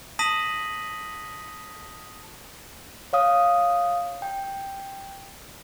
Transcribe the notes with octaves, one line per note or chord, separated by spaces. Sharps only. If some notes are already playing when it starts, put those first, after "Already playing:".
A5 D#6 A#6 B6 D#7 F#7
C#5 F5 D#6
G5